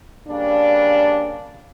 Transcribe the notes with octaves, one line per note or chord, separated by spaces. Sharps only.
C#3 G3 A#3 D4